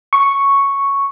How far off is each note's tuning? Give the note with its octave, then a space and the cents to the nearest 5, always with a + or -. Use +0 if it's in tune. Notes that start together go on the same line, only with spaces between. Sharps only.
C#6 +0